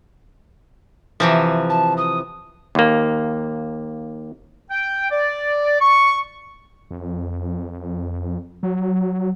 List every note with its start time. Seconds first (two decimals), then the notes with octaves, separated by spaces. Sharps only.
1.20 C3 E3 F3
1.69 A5
1.97 D#6
2.75 D#2 A#3
4.70 G5
5.10 D5
5.80 C#6
6.91 F2
8.63 F#3